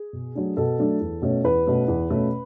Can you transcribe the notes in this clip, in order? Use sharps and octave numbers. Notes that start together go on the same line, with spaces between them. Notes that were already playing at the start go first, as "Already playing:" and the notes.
Already playing: G#4
B2
F#3 A3 D4
B2 A4
F#3 A3 D4
E2
B2 A3 C#4
E2 B4
B2 A3 C#4
E2
B2 A3 C#4